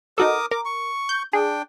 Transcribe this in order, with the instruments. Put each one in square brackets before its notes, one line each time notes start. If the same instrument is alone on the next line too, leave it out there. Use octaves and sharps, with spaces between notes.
[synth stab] D#4 F#4 A4 [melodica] A#4 D6 D#6
[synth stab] A#4 [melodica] D6
[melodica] C#6
[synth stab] G6
[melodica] D4 G5 [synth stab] G#4